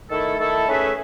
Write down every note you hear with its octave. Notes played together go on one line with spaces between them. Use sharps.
D#3 A3 E4 A4
D#3 A3 E4 A4
A3 C#4 G#4 B4 E5